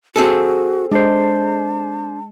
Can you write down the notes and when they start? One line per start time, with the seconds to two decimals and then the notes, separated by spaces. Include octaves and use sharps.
0.16 C4 F#4 G#4 A4
0.92 G#3 D4 C5 A5